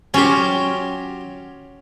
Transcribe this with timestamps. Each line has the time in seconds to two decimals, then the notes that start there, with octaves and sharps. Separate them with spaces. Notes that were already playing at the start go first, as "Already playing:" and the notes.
0.14 F#3 C#4 F4 G4